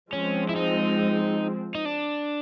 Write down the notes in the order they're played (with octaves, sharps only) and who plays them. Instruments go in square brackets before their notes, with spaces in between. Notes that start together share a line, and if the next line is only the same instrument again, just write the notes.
[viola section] F3 G#3 C4 [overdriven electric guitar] C#4
[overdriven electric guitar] E4
D#4
D#4
D4